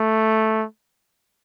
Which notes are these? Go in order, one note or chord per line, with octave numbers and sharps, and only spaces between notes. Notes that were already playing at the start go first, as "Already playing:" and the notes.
Already playing: A3